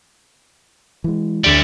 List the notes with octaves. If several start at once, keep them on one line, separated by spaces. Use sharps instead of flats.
E3 G#3
D2 G3 E4 D5 C#7